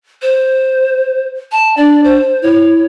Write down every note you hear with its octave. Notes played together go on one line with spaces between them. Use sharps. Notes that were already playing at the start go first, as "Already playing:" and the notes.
C5
A5
D4 D5
C5
E4 C#5